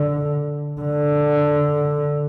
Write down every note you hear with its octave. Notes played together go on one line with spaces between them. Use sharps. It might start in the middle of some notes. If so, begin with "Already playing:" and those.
Already playing: D3
D3